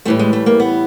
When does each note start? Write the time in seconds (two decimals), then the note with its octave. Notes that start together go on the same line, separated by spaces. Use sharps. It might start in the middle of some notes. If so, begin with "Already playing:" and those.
0.05 A2 E3 G3 A3
0.19 G#3
0.33 A3
0.46 A#3
0.60 B3